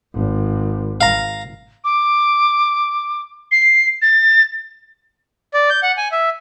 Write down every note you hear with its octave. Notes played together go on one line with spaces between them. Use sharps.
G#1
F5 A#5
D6
C7
A6
D5
G6
F#5
G#5
E5